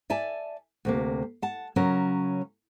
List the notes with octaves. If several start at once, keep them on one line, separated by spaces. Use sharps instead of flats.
D5 E5 G#5 A5
D2 C3 A#3
F#5 A5
C#3 F#3 C#4 A#4